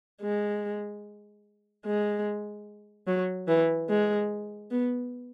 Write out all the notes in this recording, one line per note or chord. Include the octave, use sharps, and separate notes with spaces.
G#3
G#3
F#3
E3
G#3
B3